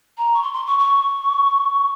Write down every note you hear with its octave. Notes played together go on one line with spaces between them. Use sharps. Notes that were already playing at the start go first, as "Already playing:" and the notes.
A#5
C#6
C6
C6
C#6
C#6